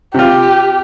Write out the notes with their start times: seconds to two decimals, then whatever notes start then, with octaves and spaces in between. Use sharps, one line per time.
0.14 C3 F4 G4